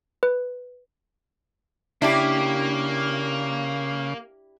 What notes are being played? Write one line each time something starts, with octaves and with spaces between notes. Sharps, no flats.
B4
C#3 A#3 D4 E4 G4